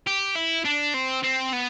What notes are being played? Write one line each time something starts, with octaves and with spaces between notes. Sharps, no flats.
G4
E4
D4
C4
C4
B3